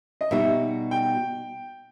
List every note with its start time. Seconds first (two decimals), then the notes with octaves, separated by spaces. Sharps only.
0.21 D#5
0.31 B2 G3 D#4 F#4 E5
0.91 G5